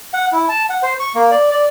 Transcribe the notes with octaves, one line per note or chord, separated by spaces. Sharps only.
F#5
E4
A5
F#5
C5
C#6
A#3
D5
D5